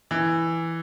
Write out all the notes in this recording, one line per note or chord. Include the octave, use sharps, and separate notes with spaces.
E3